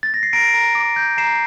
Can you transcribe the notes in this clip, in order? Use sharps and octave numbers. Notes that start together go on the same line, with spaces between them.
A6
A#6
C7
A#5 A#6 D7
A#5
D6
G6
A#5 C7 E7